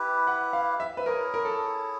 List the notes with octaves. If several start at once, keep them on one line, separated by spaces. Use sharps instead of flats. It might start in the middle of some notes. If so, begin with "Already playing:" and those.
Already playing: E4 G4 B4
F#5
F5
E5
B4
E4 G#4 A#4 C#5
A#4
A4